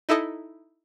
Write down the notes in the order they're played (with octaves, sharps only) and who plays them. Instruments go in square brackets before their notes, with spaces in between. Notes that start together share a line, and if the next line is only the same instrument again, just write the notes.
[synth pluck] D#4 E4 A4 D#5